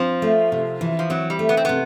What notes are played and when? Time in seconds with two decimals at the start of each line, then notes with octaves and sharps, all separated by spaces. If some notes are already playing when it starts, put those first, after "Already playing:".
Already playing: F3 C4
0.22 A3
0.52 C3
0.81 E3
0.99 F3
1.10 F#3 C4
1.30 G3
1.39 A3
1.49 B3
1.57 C4
1.65 C3 B3